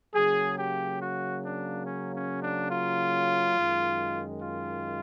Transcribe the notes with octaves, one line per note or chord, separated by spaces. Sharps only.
C#3 F#3 A#3 G#4
G4
F#4
D4
C#4
C#4
D4
F4
F#2 D#3 G#3
F4